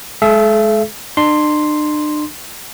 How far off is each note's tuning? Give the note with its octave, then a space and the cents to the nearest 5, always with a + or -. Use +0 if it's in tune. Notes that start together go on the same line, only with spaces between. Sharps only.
G#3 +30 A4 -40 E5 +30
D4 +40 C6 +0